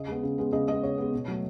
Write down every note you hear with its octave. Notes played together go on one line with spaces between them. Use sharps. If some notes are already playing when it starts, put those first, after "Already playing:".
Already playing: C#3 D#5
G#3 B3
C#3
G#3 B3
C#3 D#5
G#3 B3 D#5
C#3 C#5
G#3 B3
B2
F#3 A3